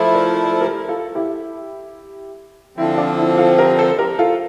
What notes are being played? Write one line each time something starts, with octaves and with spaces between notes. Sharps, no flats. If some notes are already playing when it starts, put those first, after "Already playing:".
Already playing: F3 A3 E4
A#4 D5
C5
D5
A4 C5
G4 A#4
F4 A4
E4 G4
D3 F3 C4 E4
D4 F4
E4
F4 A4
G4 A#4
A4 C5
G4 A#4
F4 A4